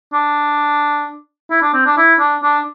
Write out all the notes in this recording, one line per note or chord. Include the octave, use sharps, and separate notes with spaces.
D4
E4
D4
C4
D4
E4
D4
D4